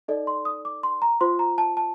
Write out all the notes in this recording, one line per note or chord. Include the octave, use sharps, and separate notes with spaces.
D#4 A4 D5 D#5
C6
D#6
D6
C6
A#5
F4 C5 C6
A#5
A5
A5